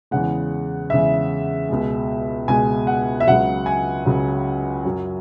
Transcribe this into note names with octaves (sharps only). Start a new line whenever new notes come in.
E2 C#3 G#3 F#5
E2 C#3 G#3 E5
C#2 B2 G#3
C#2 B2 G#3 G#5
F#5
E5
C#2 C#3 F#3 F#5
G#5
C#2 C#3 F#3
F#2 F#3